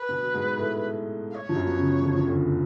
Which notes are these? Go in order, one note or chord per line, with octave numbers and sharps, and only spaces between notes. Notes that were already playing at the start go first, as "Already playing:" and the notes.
Already playing: B4
B2 B3
F#3
G#2 G#3
A2 A3
F5
C#5
F3
F#2 F#3
B3
C#3 C#4
F2 F3
F3
D2 D3
B3